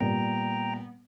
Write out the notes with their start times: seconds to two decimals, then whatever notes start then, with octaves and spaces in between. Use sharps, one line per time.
0.01 A#2 G3 B3 G5 A#5